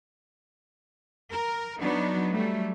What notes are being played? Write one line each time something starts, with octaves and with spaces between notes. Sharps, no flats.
A#4
F#3 B3 D4 D#4
F#3 G3 A3